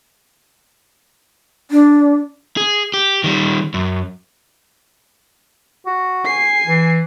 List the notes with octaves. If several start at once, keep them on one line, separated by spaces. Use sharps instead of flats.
D4
G#4
G4
D#3 G3
F#2
F#4
G#5 C7
E3